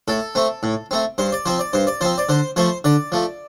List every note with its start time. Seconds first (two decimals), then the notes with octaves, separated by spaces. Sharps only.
0.08 A2 A4
0.35 A3 C4
0.63 A2
0.91 A3 C4
1.18 G2 C5
1.32 D5
1.46 F3 C4 C5
1.59 D5
1.73 G2 C5
1.87 D5
2.01 F3 C4 C5
2.18 D5
2.29 D3 C5
2.56 F3 A3 C5
2.84 D3 D5
3.12 F3 A3